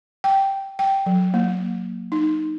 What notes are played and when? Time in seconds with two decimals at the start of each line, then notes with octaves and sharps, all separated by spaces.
0.24 G5
0.79 G5
1.06 F#3
1.34 A#3
2.12 D#4